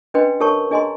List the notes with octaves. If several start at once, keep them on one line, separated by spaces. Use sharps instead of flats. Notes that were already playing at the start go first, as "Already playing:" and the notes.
C#4 D4 B4 D#5 G5 C6
G4 A#4 C#5 A5 C#6
D4 G#4 D#5 G#5 A#5 C6